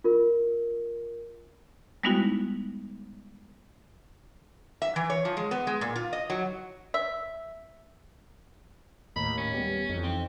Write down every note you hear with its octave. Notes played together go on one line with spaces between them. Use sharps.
F4 A#4
G3 G#3 B3 D#4 E4 F#4
E5
E3
C#5
F3
G#3
B3
G#3
A#2
F4
D#5
F#3
E5
D#2 A2 D#5 A#5 B5
C#4
G3 B3 G4
F2 E3 D#4
C4